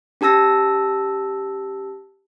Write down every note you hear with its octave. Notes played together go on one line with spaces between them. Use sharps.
C#4 G4 A5 E6 A#6